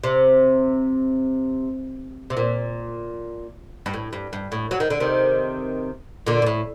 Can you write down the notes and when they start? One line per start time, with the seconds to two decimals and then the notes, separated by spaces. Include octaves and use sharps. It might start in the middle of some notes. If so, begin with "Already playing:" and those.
0.04 C3
2.30 C3
2.37 A#2
3.86 G2
3.94 A2
4.13 G2
4.33 G2
4.52 A2
4.71 F#3
4.80 D#3
4.90 D3
5.00 C3 D#3
6.26 A#2 D3
6.42 A#2
6.46 A2